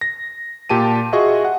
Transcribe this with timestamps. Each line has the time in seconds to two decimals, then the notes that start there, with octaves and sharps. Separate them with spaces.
0.01 A#6
0.69 A#2 G4 A5 D#7
1.12 F4 F#4 G#4 D#5 E5 C#6
1.45 F#5